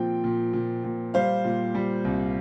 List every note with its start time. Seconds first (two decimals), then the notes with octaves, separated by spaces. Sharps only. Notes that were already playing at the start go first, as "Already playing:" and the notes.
Already playing: A#2 F3 C4 G5
0.24 A#2
0.53 A#2
0.84 A#2
1.14 G3 C5 F5
1.44 A#2
1.75 G3
2.05 C2